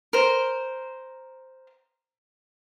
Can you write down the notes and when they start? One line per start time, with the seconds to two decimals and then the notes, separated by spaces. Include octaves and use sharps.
0.13 A#4 C5